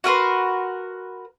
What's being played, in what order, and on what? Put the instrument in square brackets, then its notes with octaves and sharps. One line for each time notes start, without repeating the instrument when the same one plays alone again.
[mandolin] F#4 A#4 B4 C6